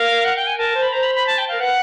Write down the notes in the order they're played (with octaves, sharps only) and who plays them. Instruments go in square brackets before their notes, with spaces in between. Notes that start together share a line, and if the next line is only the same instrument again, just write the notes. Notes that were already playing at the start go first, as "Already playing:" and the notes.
Already playing: [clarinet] A#4 [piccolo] F5
[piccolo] F#5
G5
G#5
[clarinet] A#4 [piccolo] A5
[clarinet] C5
[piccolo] B5
[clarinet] C5 [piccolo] A#5
[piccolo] B5
B5
A5
G5
[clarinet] A#4 [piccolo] F5
[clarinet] B4 [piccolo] F#5